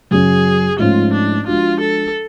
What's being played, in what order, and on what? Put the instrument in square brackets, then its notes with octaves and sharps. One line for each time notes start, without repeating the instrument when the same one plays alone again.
[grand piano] F#2 C#3 F#3 C#4 [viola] G#4
[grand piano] G#2 F3 A3 C#4 [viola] F4
[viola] D4
[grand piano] F3 G#3 D4 F#4 [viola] F4
[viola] A4